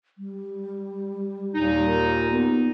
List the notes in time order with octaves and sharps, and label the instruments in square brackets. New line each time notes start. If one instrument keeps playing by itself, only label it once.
[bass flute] G3
[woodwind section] D#2 A#2 D#4
[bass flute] A#4
B3